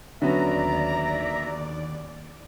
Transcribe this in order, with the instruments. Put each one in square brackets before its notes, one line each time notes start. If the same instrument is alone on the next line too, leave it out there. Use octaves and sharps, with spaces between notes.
[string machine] D#2 D5 [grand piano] D3 B3 [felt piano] F#3 C#4 [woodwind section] E5 A#5